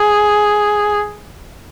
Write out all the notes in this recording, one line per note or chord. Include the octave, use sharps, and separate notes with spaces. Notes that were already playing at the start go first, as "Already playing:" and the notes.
Already playing: G#4